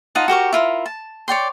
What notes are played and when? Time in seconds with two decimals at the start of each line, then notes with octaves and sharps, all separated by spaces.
0.15 D#4 F4 F#5 A5
0.28 F#4 G4 A#4 C#6
0.53 E4 F4 A#4
0.86 A5
1.28 C#5 D5 G5 C6